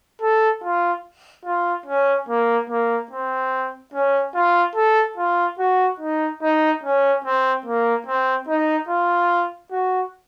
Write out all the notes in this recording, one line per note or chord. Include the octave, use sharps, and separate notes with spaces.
A4
F4
F4
C#4
A#3
A#3
C4
C#4
F4
A4
F4
F#4
D#4
D#4
C#4
C4
A#3
C4
D#4
F4
F#4